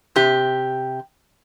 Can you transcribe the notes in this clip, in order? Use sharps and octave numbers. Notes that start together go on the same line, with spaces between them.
C3 G4